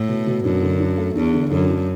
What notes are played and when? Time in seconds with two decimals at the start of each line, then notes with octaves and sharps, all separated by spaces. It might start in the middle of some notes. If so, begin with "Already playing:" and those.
Already playing: A2
0.09 B2
0.27 B2
0.44 F#2 D4
0.62 D3
0.80 D4
0.98 A3
1.16 E2 D4
1.34 D3
1.51 F#2 D3
1.69 D4